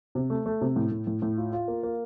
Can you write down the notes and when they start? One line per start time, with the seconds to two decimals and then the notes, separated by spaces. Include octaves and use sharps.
0.15 C3
0.30 A3
0.46 A3
0.61 C3
0.76 A2
0.91 A2
1.07 A2
1.22 A2
1.38 F4
1.53 F4
1.68 A#3
1.83 A#3